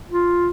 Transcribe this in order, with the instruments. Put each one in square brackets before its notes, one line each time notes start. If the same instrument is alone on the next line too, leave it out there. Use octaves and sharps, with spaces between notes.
[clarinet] F4